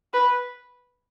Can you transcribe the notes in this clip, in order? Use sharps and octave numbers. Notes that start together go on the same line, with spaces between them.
B4